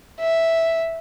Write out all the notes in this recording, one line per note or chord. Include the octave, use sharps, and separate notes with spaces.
E5